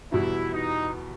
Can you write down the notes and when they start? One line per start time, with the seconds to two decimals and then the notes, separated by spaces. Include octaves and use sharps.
0.12 E2 B2 G3 E4
0.53 D#4